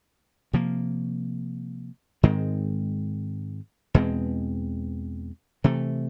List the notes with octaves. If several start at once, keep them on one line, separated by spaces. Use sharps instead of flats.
C3 F3 A#3
G#2 D#3 G#3 C4
E2 B2 G#3 C4
C3 E3 A3